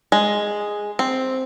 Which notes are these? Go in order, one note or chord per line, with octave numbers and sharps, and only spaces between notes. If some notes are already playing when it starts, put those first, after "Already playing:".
G#3
C4